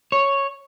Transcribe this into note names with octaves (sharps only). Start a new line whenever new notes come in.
C#5